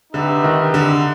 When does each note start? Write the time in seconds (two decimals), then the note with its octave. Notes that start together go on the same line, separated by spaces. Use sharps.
0.13 D3 D#4 G4 B4 E5
0.44 D#3
0.74 D3